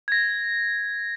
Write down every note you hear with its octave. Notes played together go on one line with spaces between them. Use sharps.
G#6 A#6